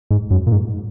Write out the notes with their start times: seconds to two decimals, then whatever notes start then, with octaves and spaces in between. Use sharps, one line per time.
0.11 G#2
0.31 F#2
0.47 A#2
0.52 G#2